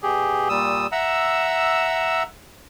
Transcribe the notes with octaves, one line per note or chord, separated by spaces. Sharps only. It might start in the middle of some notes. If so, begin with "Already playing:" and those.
B2 G4 G#4
A#2 G3 D#6 E6
E5 F#5 A#5 E6